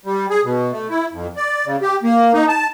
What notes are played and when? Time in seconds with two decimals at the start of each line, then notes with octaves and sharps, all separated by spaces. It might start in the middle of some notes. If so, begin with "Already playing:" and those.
0.05 G3
0.30 G#4
0.44 B2
0.72 A3
0.90 E4
1.13 F2
1.37 D5
1.66 C#3
1.82 G4
2.03 A#3
2.34 D#4
2.48 A5